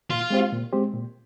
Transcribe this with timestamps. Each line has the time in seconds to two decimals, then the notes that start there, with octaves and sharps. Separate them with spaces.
0.10 A#2 F4
0.30 G#3 C4 G4 C5
0.52 A#2
0.73 G#3 C4 G4 C5
0.93 A#2